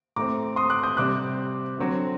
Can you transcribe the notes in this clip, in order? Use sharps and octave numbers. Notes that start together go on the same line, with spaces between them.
A2 A3 C4 A#5 D6
C6 D#6
D6 F#6
D#6 G6
C3 G3 C4 D6 F#6
D3 F#3 C4